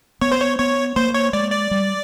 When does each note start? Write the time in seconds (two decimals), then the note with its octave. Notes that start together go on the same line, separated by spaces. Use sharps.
0.21 B3 C#5
0.31 C5
0.41 C#5
0.59 B3 C#5
0.96 A#3 C5
1.14 C#5
1.33 G#3 D5
1.52 D5
1.71 G3